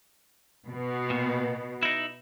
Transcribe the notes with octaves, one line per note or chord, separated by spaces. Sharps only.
B2
A#2
D#4 E4